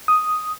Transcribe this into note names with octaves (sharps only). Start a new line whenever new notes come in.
D#6